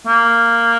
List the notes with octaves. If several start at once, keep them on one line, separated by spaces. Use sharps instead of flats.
A#3